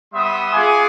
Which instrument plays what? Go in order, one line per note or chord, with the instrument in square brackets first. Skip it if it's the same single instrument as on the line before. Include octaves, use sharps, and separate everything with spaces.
[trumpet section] G3 B3 E5 C6 D#6
F4 G#4 F#5 G#5 D6